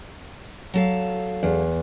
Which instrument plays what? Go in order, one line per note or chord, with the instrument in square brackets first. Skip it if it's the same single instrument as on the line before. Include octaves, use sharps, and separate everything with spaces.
[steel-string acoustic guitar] F#3 A4 F5
[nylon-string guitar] E2